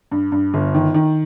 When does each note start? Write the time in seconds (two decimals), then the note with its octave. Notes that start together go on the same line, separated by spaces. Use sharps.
0.11 G2
0.32 G2
0.54 G1
0.74 D#3
0.94 D#3